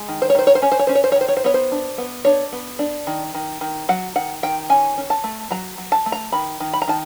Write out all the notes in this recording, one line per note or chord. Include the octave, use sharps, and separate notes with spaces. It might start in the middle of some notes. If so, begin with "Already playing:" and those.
Already playing: G#3
D#3
C5
C#5
D#3 C5
C#5
C5
C#4 C#5
C5
C#5
C#4 C5
C#5
C5
C#5
D#3 C5
C#5
C5
B3 C#5
C5
D4
B3
D4 C#5
B3
D4
D#3
D#3
D#3
F#3 F#5
D#3 F#5
D#3 G5
C#4 G#5
C#4
A5
A3
F#3 A#5
F#3
A5
A3
A#5
D#3 B5
D#3
B5
A#5
D#3 A5